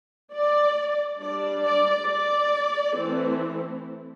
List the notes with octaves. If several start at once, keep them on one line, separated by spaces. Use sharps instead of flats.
D5
G3 D4 D5
D5
D5
E3 A3 C4